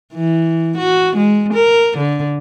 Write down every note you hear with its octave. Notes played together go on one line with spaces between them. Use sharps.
E3
F#4
G#3
A#4
D3